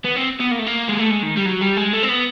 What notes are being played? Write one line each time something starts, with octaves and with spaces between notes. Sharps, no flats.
B3
C4
B3
A#3
A3
A#3
G#3
A3
G#3
D#3
G3
F#3
G3
G#3
A3
C4
B3